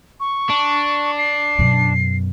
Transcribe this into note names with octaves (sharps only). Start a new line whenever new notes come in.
C#6
D4
C7
F#2 B2